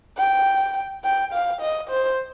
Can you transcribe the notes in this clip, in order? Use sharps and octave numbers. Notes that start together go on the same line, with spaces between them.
G5
G5
F5
D#5
C5